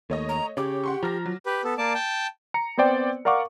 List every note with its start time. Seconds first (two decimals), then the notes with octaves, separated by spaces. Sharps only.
0.10 D#2 A3 C#5 D#5
0.29 A#5
0.57 C#3 G4 C#5 D6
0.84 F#5 C6 C#6
1.03 F3 A#5 F6 A#6
1.26 F#3
1.46 G4 B4
1.64 B3 A4
1.78 A#3 D5 A5
1.95 G5 A5
2.54 A#5 C#7
2.77 B3 C4 C5 D5 G5
3.25 A#4 D5 F5 F#5 C#6 D6